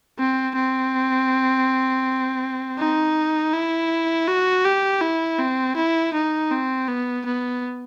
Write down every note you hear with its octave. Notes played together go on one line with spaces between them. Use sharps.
C4
C4
D#4
E4
F#4
G4
E4
C4
E4
D#4
C4
B3
B3